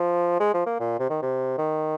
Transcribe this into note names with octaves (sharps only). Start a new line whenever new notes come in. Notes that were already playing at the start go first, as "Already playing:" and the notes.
Already playing: F3
G#3
F3
A#3
A#2
C3
D#3
C3
D#3